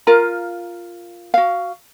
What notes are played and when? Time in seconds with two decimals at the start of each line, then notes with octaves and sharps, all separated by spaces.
0.07 F4 A#4 F5 A#5
1.34 F#4 F5